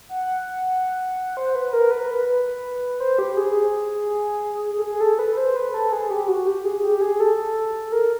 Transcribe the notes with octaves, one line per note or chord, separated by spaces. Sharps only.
F#5
C5
B4
A#4
B4
B4
B4
C5
G4
G#4
A4
G#4
A4
B4
B4
C5
B4
A4
G#4
G4
F#4
G4
G#4
G4
G#4
A4
A#4